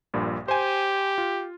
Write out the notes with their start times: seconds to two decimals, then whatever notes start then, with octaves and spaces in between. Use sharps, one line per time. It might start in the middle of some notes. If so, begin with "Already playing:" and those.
0.14 A#1 G2 A#2
0.48 G4 C5 G#5
1.18 F4